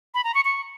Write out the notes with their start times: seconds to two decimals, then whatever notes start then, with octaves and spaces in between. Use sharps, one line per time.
0.14 B5
0.24 A#5
0.34 C#6
0.45 C#6